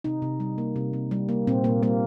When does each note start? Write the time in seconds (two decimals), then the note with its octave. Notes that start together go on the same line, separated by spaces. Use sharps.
0.04 C3 D#4
0.22 C3
0.40 G3
0.58 A#3
0.76 C3
0.93 C3
1.11 G3
1.29 A#3
1.47 A#2 C4
1.64 A#2 A#3
1.83 G3 A#3